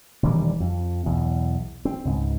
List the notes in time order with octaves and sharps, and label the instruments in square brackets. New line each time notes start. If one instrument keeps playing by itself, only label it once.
[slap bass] E1 D#3 E3 G3
F2
B1 E2
C4
C#2 G#2